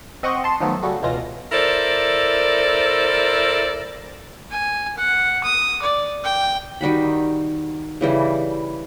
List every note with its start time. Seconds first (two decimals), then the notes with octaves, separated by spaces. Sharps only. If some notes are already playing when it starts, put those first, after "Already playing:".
0.23 C4 D#5 F#5 C#6 G6
0.44 A5 C6
0.60 D#3 F3 F#3 A3 B3 A4
0.83 C#3 G3 F#4 A4
1.03 C#2 B2 E3 F4 A#6
1.52 E4 A4 A#4 C5 D5
4.51 G#5
4.98 F#5
5.44 D#6
5.82 D5
6.24 G5
6.81 D#3 G3 F#4 B5
8.01 C#3 E3 G3